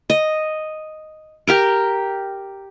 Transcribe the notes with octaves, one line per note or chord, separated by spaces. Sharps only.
D#5
G4 A#4 G5